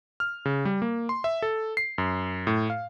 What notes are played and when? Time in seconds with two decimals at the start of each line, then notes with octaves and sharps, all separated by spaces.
0.20 F6
0.45 C#3
0.65 G3
0.82 A#3
1.09 C6
1.24 E5
1.42 A4
1.77 C7
1.98 F#2
2.47 A2
2.70 F5